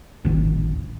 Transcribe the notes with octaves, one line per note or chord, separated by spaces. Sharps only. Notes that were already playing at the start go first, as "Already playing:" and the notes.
D1 G#1